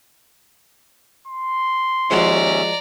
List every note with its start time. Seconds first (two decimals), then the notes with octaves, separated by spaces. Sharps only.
1.27 C6
2.10 D#2 F3 G#3 C#4 F#4 D5 E5 A#5